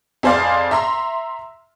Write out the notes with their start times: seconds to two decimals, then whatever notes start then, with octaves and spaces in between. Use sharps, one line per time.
0.23 F2 G#4 C5 D5 F5
0.71 E5 A#5 C6